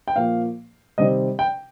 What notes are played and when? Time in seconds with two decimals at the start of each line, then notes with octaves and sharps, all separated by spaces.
0.08 G5
0.15 A#2 F3 A#3 F5
0.98 C3 D#3 G3 C4 D#5
1.39 G5